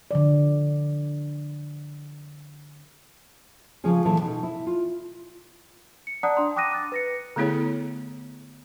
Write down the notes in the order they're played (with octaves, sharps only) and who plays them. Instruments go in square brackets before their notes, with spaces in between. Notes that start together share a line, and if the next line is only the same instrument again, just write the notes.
[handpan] D3 F3 D5
[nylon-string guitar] C#3 F3 G#3 C#4 G#4
D2 A#2 E3 F#3 A4 A5
B2 D#4
E4
F4
[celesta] C#7
D5 F#5 A5 A#5 D#6 F#6
D4 A#5 C6
G5 D6 D#6 F#6 A#6 D#7
D6 F#6 A6
B4 A#6 C#7
[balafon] D3 A3 B3 E4 G#4 C#5